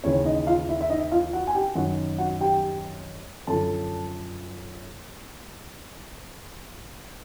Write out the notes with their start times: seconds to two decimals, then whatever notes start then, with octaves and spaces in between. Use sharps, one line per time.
0.04 D#2 C#3 E3 C#4 C#5
0.25 D#4 D#5
0.47 F4 F5
0.69 E4 E5
0.81 E5
0.90 D#4 D#5
1.11 F4 F5
1.33 F#4 F#5
1.47 G#5
1.55 G4 G5
1.75 F#2 D#3 F#4 F#5
2.18 F#4 F#5
2.41 G4 G5
3.47 F#2 D3 F3 A4 A5